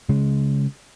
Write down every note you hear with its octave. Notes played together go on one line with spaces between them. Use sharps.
C#3 G#3